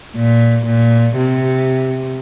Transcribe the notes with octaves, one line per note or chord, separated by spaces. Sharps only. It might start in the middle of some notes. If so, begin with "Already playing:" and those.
A#2
A#2
C3